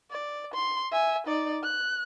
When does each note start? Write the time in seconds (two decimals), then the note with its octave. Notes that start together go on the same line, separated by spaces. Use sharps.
0.11 D5
0.54 C6
0.91 E5 G#5
1.27 D#4 D5
1.63 F#6